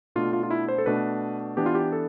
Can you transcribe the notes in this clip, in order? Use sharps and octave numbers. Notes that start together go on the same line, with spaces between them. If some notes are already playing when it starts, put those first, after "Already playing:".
B2 A3 D4 F4
F4
F4
E4
C5
A4
B2 A3 D4 B4
E3 B3 D4 G4
F4
G4
A4